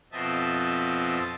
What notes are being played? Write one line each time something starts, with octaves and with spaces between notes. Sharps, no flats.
F2 B2 C4 D#5 E5 A5